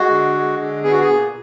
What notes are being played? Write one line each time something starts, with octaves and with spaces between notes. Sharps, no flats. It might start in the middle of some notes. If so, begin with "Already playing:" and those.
Already playing: G#3 F#4
D3
G#3
D3
B3 G#4
F#4
G#4
A#2